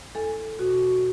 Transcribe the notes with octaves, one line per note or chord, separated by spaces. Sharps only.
E2 A4
B2 F#4